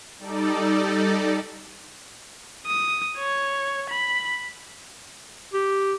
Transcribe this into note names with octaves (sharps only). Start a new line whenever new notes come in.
G3 D#4 A4 D5
D#6
C#5
B5
G4